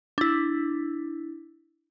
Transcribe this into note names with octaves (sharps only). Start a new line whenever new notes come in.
D4 E4